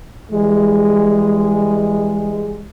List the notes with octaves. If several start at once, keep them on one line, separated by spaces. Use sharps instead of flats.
E3 G3 G#3